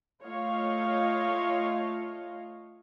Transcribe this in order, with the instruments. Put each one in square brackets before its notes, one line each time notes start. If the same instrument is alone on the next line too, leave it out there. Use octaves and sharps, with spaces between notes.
[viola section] A3 F4 C#5 D#5 F5